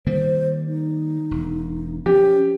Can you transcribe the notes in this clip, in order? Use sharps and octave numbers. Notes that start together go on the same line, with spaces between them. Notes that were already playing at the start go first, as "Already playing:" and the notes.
D#3 G3 A#3 C5
D#4
E1
F3 C#4 G4